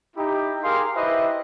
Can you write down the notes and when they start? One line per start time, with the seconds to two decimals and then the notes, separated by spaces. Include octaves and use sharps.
0.17 D#4 E4 G4
0.63 G4 G#4 A#4 F5 C6
0.96 E4 G4 B4 C5 D#5 E5